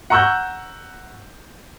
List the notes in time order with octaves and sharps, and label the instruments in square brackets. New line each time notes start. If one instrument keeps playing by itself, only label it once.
[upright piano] F#5 A#5 C#6 E6 F#6 G6